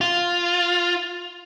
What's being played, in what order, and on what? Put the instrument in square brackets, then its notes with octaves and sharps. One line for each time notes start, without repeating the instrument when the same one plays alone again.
[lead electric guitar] F4